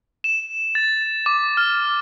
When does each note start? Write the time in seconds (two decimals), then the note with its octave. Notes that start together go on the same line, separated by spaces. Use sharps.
0.24 E7
0.75 A6
1.26 D6
1.57 F6